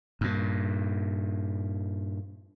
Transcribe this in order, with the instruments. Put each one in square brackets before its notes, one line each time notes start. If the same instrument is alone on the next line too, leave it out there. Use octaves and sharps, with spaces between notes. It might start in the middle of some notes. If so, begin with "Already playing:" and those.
[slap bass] G2 A#2